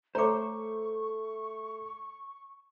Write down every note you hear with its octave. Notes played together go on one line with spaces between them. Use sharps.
A3 C5 C#5 A#5 C#6 D6